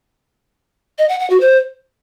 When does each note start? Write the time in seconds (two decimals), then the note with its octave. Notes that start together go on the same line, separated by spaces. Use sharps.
0.99 D#5
1.09 F#5
1.20 F#5
1.30 F#4
1.41 C5